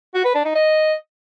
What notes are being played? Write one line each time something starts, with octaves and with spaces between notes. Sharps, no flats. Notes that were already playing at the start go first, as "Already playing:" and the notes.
F#4
B4
D4
D#4
D#5